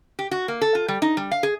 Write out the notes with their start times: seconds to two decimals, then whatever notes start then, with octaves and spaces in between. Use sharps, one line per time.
0.19 G4
0.31 F#4
0.48 A#3
0.61 A4
0.75 F4
0.88 G3
1.02 D#4
1.17 G3
1.31 F5
1.43 G#4